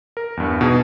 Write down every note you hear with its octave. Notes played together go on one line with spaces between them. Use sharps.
A#4
E2 G2
B2 B3 D#4 F#4 G#4 B4